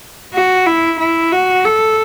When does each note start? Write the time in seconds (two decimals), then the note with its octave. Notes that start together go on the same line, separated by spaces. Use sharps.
0.34 F#4
0.66 E4
0.99 E4
1.32 F#4
1.65 A4